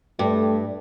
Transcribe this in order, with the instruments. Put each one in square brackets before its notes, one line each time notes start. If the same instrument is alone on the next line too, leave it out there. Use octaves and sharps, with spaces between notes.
[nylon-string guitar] G2 [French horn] A3